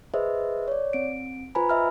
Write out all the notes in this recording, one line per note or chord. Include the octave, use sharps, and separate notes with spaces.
G#4 B4 C5 D#5 E5
C#5 D5
C4 D7
F4 B4 C5 G#5 A#5 B5
D#5 E5 F6